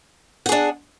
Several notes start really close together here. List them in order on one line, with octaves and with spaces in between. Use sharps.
F#5 G#4 D4